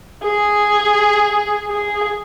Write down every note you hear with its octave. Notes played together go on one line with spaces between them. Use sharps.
G#4
G#4